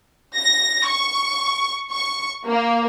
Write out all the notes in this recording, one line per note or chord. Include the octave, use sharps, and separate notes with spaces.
A#6
C#6
C#6
A#3